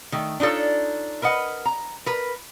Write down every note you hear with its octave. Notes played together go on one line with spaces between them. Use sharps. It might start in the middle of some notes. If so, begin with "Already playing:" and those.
D#3 A3
D4 D#4 F4 A4 C#5
A#4 B4 D#5 F#5
A#5
A#4 B4